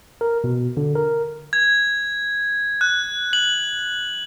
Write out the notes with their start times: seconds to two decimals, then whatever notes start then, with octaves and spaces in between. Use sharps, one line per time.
0.21 A#4
0.44 B2
0.77 D3
0.95 A#4
1.53 G#6
2.81 F#6
3.33 F#7